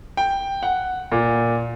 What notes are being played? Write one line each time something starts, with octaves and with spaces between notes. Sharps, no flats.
G5
F#5
A#2